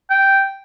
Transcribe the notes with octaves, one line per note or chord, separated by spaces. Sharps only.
G5